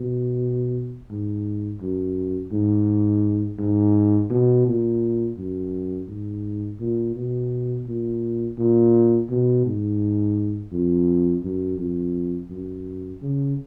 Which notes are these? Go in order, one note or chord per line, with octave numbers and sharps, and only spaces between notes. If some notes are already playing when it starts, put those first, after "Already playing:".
Already playing: B2
G#2
F#2
G#2
G#2
B2
A#2
F#2
G#2
A#2
B2
A#2
A#2
B2
G#2
F2
F#2
F2
F#2
C#3